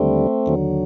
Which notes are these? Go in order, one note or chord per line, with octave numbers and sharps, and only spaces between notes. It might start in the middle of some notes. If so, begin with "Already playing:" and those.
Already playing: D#2 D3 G3 A3 C4
D#2 D3 F#3